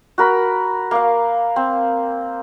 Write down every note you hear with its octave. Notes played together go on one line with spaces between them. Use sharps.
F#4 A#4 B5
A#3 F5
C4